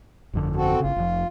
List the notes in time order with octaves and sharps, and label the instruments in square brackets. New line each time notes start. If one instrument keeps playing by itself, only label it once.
[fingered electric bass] G1 F2 D3
[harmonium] C4 F#4 A4
[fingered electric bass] G1 C#3 [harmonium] F4
[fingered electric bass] F1 F3